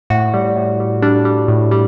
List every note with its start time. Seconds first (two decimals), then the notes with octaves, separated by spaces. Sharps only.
0.10 A2 F#4
0.34 G3
0.56 A2
0.80 G3
1.02 G3 D4
1.25 G3
1.48 A2
1.71 G3